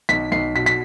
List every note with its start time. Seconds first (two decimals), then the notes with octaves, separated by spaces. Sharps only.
0.09 B1 B6
0.32 B1 C7
0.55 B2 B6
0.66 B6